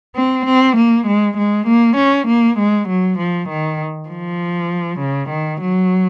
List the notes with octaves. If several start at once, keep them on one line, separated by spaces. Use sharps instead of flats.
C4
C4
A#3
G#3
G#3
A#3
C#4
A#3
G#3
F#3
F3
D#3
F3
C#3
D#3
F#3